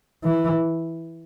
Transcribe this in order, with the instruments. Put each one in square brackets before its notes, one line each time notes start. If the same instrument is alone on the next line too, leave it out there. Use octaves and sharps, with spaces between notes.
[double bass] E3